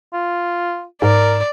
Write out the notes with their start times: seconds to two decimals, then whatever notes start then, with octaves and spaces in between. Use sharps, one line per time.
0.13 F4
1.02 G#2 A#4 D5